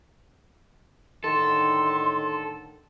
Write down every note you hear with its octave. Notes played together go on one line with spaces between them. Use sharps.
A2 D3 D#3 A4 C6